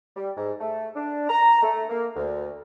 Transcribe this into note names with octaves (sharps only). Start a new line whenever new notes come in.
G3
G#2
A3
D4
A#5
A3
A#3
D2